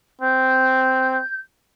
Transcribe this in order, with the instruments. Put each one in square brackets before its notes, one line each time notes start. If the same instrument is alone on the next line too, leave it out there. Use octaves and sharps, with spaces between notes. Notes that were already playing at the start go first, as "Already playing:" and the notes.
[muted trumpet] C4 [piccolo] G6